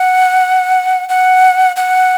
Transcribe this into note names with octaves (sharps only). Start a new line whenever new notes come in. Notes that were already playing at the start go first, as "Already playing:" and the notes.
Already playing: F#5
F#5
F#5